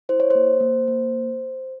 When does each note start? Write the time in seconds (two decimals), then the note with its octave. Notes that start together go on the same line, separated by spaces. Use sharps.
0.09 E4 C5
0.20 C#5
0.30 A#3 C5
0.61 A#3
0.88 A#3